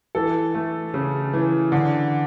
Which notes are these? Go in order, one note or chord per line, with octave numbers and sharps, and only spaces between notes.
E3 A4
A3
C#3
E3
D3